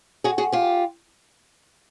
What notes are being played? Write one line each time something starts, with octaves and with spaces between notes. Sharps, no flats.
F#4 G#4
F#4 G#4
F4 G4